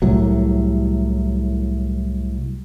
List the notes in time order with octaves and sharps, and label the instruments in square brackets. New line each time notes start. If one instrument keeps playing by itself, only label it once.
[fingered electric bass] C2 A2 F#3